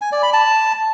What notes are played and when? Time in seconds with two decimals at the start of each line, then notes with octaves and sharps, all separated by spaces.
0.02 G#5
0.12 D5
0.23 B5
0.33 A5